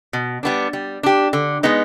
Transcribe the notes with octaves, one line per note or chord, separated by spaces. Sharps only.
B2
G3 B3 D4
G3
D4 G4
D3
G#3 B3 D#4